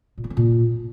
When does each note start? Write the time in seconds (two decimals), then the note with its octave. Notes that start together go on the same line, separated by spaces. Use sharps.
0.18 A#2
0.24 B3
0.30 C4
0.37 A#2